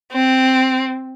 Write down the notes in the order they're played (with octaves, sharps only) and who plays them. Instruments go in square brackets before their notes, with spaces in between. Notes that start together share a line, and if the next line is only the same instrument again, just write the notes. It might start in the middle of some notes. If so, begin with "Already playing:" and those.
[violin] C4